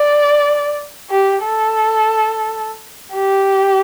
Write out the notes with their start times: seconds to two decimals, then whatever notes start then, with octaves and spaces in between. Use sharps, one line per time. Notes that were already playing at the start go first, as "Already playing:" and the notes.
Already playing: D5
1.10 G4
1.44 A4
3.14 G4